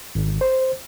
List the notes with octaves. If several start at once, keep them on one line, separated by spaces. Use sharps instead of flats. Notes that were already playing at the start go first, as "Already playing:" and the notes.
G#1
C5